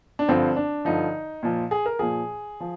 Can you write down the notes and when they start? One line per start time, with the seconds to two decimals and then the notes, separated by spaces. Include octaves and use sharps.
0.19 D4
0.29 G2 D3 F3 C4
0.56 D4
0.85 G2 D3 F3 D#4
1.43 A#2 F3
1.71 G#4
1.86 A#4
1.99 A#2 F3 G#4
2.60 F3